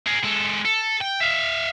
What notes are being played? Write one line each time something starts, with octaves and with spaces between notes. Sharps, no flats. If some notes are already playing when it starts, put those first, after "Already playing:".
G#4 A#4
G#3 A4
A4
G5
E5 F5